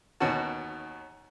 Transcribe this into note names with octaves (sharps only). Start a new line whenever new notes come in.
D#2 B2 C#4 F#4 A5